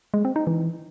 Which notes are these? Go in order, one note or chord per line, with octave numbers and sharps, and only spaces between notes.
G#3
C4
D#4
E3